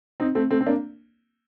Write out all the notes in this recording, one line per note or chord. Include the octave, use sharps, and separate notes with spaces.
C4 D#4
A3 C4
A3 C4
C4
A#3 D4